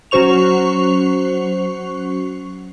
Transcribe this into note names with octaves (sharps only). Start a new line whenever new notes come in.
F#3 C#4 F#4 C5 C#6 F7